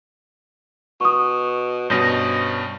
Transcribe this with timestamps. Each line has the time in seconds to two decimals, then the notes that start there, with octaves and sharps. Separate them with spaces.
1.01 B2 C#6 D#6
1.90 G2 B2 C#4 C5 D#5